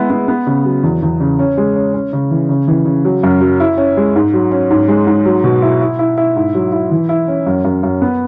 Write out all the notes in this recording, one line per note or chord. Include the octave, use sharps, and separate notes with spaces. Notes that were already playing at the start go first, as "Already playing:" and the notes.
Already playing: G#3 B3 E4
B3
B3
C#3
F#3
E2
E2
C#3
C#4
G#3
C#4
C#4
C#3
E3
C#3
E3
C#3
F#3
F#2
F#3
E4
C#4
G#3
G#2
F#3
C#4
G#2
G#3
G#2
F#3
B2
E4
E4
E4
E4
G#2
F#3
E4
E3
E4
C#4
F#2
F#2
F#2
B3